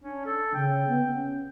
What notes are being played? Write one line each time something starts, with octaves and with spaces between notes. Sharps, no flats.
C#4 D4
A4
C#3 G5
B3
C#4